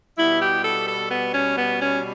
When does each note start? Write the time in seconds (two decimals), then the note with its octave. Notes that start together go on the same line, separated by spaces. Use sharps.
0.18 B2 G3 B3 E4
0.41 G4
0.64 A4
0.87 A4
1.09 B3
1.33 C#4
1.56 B3
1.78 C#4